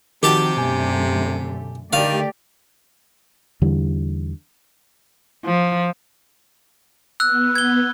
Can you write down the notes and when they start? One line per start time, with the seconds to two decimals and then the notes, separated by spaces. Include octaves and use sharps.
0.23 C3 D#3 F3 F#4 G4 A5
0.57 F#2 B2 D3 A3 G#5
1.93 D3 D#3 A3 G4 D5 F5
3.62 E2 D3 E3 G3
5.45 F3
7.20 B3 E6 F#6
7.55 G#6 G7